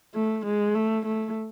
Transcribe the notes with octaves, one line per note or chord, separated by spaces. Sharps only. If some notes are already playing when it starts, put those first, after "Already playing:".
A3
G#3
A3
A3